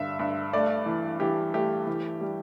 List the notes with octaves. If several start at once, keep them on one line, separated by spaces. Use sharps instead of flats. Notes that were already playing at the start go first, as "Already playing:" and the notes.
Already playing: G2 D3 G3 E5 F5
G2
A3 D5
E3
E3 G4
A3 G4
E3
G3